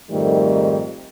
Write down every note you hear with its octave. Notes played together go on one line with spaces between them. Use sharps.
F2 G#2 D#3 G3 A3